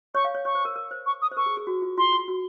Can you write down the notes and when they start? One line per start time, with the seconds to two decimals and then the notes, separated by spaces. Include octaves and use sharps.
0.15 C#5 C#6
0.24 F5
0.35 C#5
0.45 C#5 C#6
0.55 C5
0.65 A#4
0.76 A#4
0.91 C5
1.06 C#6
1.22 D#6
1.31 C5
1.37 A#4 C#6
1.46 G#4
1.57 G#4
1.67 F#4
1.82 F4
1.97 F4 C6
2.13 F4
2.28 F#4